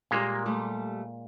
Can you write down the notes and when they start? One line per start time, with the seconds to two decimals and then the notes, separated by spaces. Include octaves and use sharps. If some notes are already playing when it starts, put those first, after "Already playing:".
0.11 A#2 G3 G#3 A#3 G4 A#4
0.46 G3 A3 G4